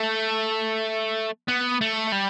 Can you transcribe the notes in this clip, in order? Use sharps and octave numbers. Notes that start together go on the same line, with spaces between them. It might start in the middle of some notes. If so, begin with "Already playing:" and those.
Already playing: A3
B3
A3
G3